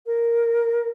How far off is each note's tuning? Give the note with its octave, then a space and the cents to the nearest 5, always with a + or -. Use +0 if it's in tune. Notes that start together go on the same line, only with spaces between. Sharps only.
A#4 +0